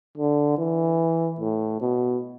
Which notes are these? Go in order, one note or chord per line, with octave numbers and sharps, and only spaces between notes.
D3
E3
A2
B2